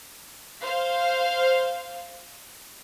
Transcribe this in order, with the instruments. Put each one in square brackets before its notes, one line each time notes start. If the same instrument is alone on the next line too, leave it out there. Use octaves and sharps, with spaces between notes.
[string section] C5 F5